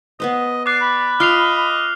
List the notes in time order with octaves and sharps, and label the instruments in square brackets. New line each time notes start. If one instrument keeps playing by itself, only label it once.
[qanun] B3 B4 C5 [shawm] D#5
[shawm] D5 [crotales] D6 F#6 [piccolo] C7
[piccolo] B5
[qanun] F4 G5 C6 [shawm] D#5 [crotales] F6 C7 F7